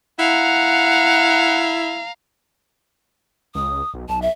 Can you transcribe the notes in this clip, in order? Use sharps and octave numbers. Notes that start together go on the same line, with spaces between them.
E4 F5 F#5 A#5
C#2 D#6
B1
B1 A5
E5